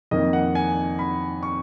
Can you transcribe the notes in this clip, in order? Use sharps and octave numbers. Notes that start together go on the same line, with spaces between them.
F2 D#3 A#3 D#5
F#5
G#5
B5
C#6